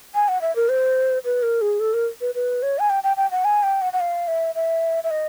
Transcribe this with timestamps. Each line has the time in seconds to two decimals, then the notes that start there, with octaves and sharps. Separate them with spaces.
0.15 G#5
0.29 F#5
0.41 E5
0.56 A#4
0.69 C5
1.25 B4
1.43 A#4
1.61 G#4
1.80 A4
1.94 A#4
2.21 B4
2.35 B4
2.63 C#5
2.79 G#5
2.90 G5
3.04 G5
3.17 G5
3.31 F#5
3.45 G#5
3.63 G5
3.82 F#5
3.93 F#5
4.00 F5
4.28 E5
4.55 E5
5.04 E5
5.11 D#5